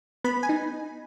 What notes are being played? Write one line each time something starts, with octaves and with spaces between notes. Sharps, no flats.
B3 B5
G#5
D#4